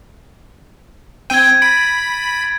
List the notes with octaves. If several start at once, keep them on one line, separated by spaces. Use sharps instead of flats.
C4 G5 G#6 D#7
B5 A6 D7